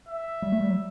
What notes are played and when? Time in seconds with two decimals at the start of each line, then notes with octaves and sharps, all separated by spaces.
0.08 E5
0.42 G3
0.52 A3
0.60 G3
0.69 F#3